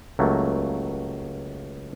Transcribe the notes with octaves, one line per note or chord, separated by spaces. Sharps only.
C#2 F#3 A3 A#3